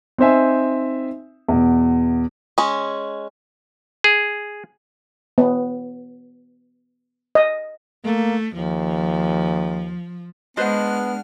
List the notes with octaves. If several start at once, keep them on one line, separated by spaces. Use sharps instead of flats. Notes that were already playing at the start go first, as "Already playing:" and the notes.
C4 D#4 C5 E5 G#5
E2 B2
G#3 C#4
G#4
B3
D#5
A3 A#3
D#2 F3
G#3 B3 D4 B4 C5 D#5 F#5 F6